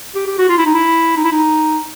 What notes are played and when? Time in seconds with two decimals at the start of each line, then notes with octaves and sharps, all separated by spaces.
0.15 G4
0.27 G4
0.38 F#4
0.49 F4
0.58 E4
0.66 D#4
0.74 E4
1.17 D#4
1.24 E4
1.32 D#4